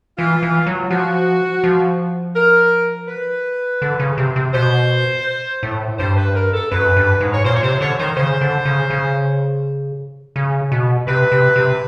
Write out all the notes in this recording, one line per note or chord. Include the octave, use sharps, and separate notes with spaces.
E3 F4
E3
F#3
F3 F#4
F3
A#4
B4
D3
C#3
C3
C3
B2 C5
A2
G2 C5
B4
A#4
A4
F#2 B4
G2
G#2
C#5
A#2 C5
C#5
C3 C5
D3 C#5
D#3 C5
C#3 C5
D3
C#3
C#3
C#3
B2
C3 B4
C3
C3